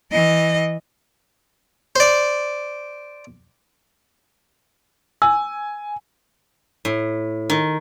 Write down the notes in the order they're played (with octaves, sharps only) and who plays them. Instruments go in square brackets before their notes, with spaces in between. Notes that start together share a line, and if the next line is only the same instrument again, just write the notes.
[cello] E3 D#5
[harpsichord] C5 D5
[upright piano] G#5 [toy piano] E6
[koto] A2
D#3